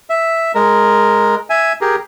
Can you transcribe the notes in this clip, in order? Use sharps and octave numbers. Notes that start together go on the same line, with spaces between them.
E5
G#3 A#4
E5 G#5
G4 G#4 A#4